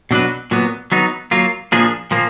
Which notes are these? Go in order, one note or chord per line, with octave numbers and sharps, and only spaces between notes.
B2 F#3 D4 F#4 B4
A#2 F#3 B3
F#3 B3 D#4
F#3 A#3 F4
A#2 F3 A#3 D4 G#4
A#2 F3 A#3